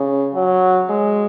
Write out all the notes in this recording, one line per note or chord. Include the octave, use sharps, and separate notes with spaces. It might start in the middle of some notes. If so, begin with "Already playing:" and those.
Already playing: C#3
F#3
G#3